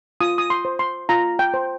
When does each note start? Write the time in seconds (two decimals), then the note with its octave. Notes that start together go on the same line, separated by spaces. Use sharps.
0.21 F4 D#6
0.38 D#6
0.50 C6
0.65 C5
0.79 C6
1.09 F4 A#5
1.39 G5
1.54 C5